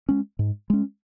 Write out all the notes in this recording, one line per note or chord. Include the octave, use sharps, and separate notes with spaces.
G#3 C#4
G#2
G#3 C#4